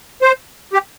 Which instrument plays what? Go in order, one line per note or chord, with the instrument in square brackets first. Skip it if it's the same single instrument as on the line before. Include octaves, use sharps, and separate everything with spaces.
[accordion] C5
G4